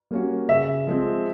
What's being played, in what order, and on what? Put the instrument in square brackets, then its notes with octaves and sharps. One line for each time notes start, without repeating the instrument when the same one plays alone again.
[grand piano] G3 A#3 C#4 F#4
[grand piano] C#3 [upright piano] E5
[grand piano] F3 G#3 C4